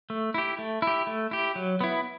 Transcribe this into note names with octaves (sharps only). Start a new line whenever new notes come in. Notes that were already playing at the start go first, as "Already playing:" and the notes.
A3
E4 G4
A3
E4 G4
A3
E4 G4
F#3
B3 E4